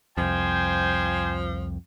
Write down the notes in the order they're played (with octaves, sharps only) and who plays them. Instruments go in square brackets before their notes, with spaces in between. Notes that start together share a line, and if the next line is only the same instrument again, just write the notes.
[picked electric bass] C2 F2 [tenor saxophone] F3 [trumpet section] C5 G5 G#5